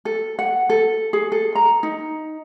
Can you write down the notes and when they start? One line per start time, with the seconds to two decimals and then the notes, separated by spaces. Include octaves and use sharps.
0.05 A4
0.39 F#5
0.70 A4
1.13 G#4
1.32 A4
1.55 A#5
1.83 D#4